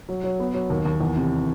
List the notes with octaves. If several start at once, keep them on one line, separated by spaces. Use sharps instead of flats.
F#3
F#3
B3
F#3
D#2
D#2
E2
C3